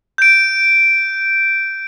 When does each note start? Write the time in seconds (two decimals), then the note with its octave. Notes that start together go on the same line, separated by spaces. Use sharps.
0.18 G6 D7